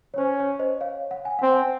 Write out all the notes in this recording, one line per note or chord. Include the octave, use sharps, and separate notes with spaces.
C#5
C#4 C5
C#5
C5 D#5
C#5 F5
F#5
G#5
C4 F#5
G#5